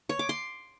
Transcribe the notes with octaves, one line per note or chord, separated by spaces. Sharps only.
C#5
D6
C6